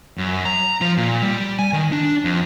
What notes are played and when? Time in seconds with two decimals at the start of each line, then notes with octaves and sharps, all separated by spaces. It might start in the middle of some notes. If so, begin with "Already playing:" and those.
0.18 F#2
0.45 A#5
0.81 F3
0.97 A#2
1.22 G3
1.59 G#5
1.73 D#3
1.92 D4
2.24 F2